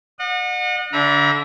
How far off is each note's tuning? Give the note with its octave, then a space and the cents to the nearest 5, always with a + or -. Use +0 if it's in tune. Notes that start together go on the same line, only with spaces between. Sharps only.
D#5 -40 F#5 -30
D3 -25 E5 +0 A#5 +35